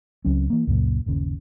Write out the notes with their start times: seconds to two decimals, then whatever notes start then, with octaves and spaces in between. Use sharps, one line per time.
0.25 C#2 F#3 C4 C#4
0.50 E3 A#3
0.67 C#2 F#2 A#2 C#3
1.06 G1 D#2 C#3